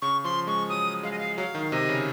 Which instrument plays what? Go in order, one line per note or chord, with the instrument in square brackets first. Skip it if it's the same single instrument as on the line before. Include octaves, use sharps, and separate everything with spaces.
[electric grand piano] C#3 [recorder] C#6
[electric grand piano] F3 [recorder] C6
[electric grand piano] G#3 [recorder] C#6
[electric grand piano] F#3 [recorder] D#6
[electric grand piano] G#3 [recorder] F5
[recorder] D#5
F5
[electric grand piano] F#3 [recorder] F5
[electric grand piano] D#3
[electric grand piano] C3 [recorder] D#5
[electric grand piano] C#3